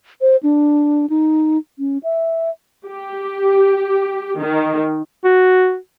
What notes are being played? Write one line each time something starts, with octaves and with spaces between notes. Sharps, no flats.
C5
D4
D#4
C#4
E5
G4
D#3
F#4